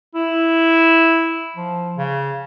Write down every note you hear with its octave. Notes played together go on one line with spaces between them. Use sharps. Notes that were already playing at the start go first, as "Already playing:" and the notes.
E4
F3
C#3